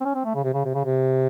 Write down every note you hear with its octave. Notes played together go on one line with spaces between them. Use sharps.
C4
C#4
C4
A3
C#3
C3
C#3
C3
C#3
C3